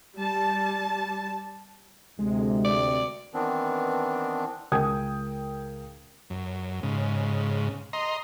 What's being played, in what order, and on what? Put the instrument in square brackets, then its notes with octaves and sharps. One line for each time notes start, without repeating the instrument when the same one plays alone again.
[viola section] G3 A5
[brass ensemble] D2 C3 [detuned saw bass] G#3
[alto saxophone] D5
[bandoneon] D#3 E3 B3 C4 D4
[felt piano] C#2 A#4 G5 D#6 G#6
[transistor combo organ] F#2
G#2 C#3
D#5 A#5 C6